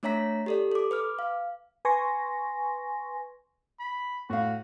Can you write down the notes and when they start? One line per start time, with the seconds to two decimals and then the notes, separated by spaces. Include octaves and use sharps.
0.03 A3 D4 C#5 E5 A#5 B6
0.46 G4 A4 D5
0.72 A4 D6
0.91 B4 D6 F6
1.19 F5
1.85 B4 G#5 C6 C#6 A#6
3.79 B5
4.30 A2 F#4 F5